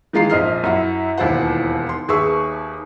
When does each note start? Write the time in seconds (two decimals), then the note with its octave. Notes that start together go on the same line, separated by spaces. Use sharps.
0.13 D#3 E3 G#3 F4 A#5 C7
0.30 A#1 F2 D#5 F6 C7
0.64 F#2 E4 F#5
1.17 E1 D#2 E4 F4 C5 F#5
1.89 C6
2.08 D#2 G#4 B4 E5 C#6 E6